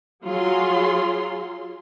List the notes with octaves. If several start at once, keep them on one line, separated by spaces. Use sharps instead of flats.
F#3 F4 G#4 C6